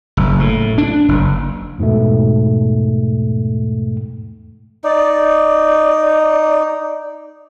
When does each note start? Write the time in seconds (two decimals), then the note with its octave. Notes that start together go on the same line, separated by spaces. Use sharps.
0.17 F#1
0.39 A2
0.78 D4
1.08 F#1
1.78 E2 G#2 B2 A3
4.84 D#4 D5